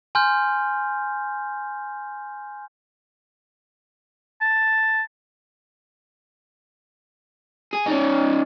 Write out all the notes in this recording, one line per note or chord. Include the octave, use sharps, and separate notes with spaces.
G#5 C6 F6 G6
A5
G#4
C#4 D#4